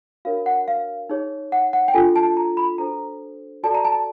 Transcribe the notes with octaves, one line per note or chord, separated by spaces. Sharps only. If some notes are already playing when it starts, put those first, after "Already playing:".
D4 F#4 A#4 C#5 F5
F#5
F5
D#4 G#4 C#5
F#5
F#5
G5
D4 F4 A4 G#5
A5
A#5
B5
D4 F#4 A4 C5 A#5
F#4 A4 D5 A5
A#5
A5